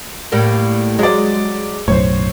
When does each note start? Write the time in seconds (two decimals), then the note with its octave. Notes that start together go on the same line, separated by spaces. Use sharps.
0.32 A2 G3 A#3
0.99 F#3 G#3 D5
1.88 B1 F#2 A2 C5 C#5